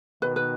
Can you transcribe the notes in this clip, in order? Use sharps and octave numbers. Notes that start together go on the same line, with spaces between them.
B2 D#3 B4
B4